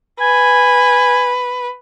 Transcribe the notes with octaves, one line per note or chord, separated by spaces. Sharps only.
B4 G#5